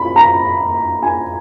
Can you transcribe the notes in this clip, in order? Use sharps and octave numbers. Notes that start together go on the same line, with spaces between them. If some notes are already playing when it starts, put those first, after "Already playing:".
Already playing: B5
A#5
G#5